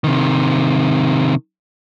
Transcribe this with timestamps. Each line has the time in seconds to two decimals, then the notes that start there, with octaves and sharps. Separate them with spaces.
0.04 C3 D#3